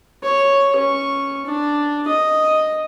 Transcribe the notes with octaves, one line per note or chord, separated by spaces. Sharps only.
C#5
C#4 C#6
D4
D#5